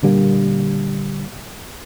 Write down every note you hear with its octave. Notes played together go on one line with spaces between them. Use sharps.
A#2 D3 G3 A#3